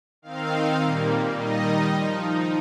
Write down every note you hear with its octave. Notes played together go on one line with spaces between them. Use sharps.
D#3 C4 D#4 F5
A#2 G3 A#3
D#3 G3 D#4 D#5
F3 D#4